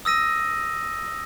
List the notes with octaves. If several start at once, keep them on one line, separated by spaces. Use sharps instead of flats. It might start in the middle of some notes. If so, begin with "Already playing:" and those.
D#6 E6 A#6 D#7